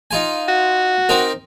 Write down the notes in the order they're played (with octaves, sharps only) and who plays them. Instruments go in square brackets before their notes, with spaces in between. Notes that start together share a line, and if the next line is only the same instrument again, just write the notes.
[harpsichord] D#4 F4 G#5
[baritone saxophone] F#4
[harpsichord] C4 D#4 A#4